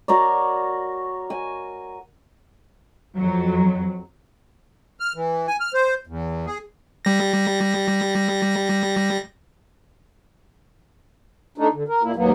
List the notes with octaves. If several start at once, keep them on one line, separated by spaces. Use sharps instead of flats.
F#4 A#4 C#5 D5
G#5
F2 F#3
F6
E3
G#5
F6
C5
E2
G#4
G3 A#6
A3 D4 D#4
D3
A#4
A#2 A#3 E4
D#2 G#2 F#3 A#3 B3